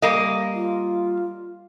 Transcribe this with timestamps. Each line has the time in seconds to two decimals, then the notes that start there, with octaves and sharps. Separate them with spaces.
0.02 G3 A#3 D#5
0.54 F4